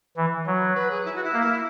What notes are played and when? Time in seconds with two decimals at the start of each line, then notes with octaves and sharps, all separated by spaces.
0.17 E3
0.47 F#3
0.75 B4
0.90 G#4
1.05 E4
1.15 F#4
1.24 E4
1.33 A#3